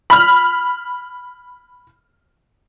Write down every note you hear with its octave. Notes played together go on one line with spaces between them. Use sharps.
B5 F6